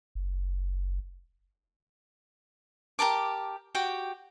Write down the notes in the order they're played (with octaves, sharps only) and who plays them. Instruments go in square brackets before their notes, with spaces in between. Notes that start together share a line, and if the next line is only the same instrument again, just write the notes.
[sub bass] F#1
[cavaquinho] G4 A#4 A5 D6
F#4 G4 G5